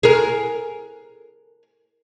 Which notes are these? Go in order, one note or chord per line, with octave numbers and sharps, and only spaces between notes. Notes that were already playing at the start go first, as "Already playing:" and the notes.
G#4 A#4